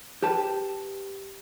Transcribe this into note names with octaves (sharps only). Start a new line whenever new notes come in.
G4 B4 A5